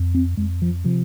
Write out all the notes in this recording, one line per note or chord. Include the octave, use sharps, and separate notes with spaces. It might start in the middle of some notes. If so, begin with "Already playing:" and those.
Already playing: F2
C4
F2 G#3
F3
C3 F3